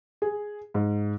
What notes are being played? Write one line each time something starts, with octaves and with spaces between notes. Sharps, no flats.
G#4
G#2